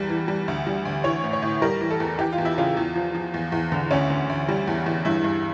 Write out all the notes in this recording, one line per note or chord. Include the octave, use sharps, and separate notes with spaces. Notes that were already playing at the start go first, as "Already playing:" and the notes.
Already playing: E2 G3
E3
G3
D2
G3
D2
E3 C#5
A2
C#5
A2
G3 A#4
E3
A4
E2
E3 G4
F4
E2
E4
C#3 F4
E2
F3
F3
E2
E2
D3
D2 C#4
D3
D2
G3
E2
E2
G2 E4
G2